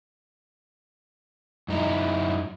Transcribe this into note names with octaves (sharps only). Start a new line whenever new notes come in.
F#2 D#4 E4